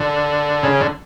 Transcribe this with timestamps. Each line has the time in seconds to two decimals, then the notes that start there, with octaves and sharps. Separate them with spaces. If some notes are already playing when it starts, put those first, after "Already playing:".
Already playing: D3
0.63 C#3
0.81 D3